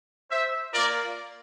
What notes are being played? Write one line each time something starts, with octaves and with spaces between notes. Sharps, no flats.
C5 E5
A#3 F4 A#4 D5